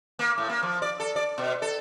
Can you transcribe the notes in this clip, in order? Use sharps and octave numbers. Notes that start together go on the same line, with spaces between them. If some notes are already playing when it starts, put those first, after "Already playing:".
A#3
A2
A#3
F3
D5
A4
D5
B2
A4